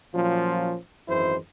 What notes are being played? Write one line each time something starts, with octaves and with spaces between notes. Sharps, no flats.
A#2 F3 F#3 C#4 F4
G#1 F#2 E3 G#3 E4 C5